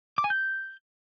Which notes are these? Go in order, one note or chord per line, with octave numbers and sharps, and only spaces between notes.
D6
G#5
G6